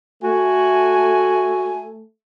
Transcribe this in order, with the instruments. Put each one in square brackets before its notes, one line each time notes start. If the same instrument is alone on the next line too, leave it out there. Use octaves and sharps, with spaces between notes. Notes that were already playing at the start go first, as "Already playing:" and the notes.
[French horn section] A3 [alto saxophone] F#4 [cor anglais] G#5